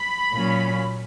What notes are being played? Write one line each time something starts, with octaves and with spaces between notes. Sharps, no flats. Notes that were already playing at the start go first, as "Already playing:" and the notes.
Already playing: B5
A#2 F#3 C#4